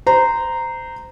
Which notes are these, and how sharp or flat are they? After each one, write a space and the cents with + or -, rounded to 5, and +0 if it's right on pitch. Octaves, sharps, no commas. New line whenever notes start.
C5 -25 A#5 -5